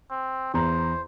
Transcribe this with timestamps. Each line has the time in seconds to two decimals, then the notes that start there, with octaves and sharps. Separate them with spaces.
0.11 C4
0.54 E2 C5 A#5